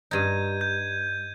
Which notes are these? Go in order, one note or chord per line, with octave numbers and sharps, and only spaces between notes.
G2 D#4 G6 G#6 D#7
G6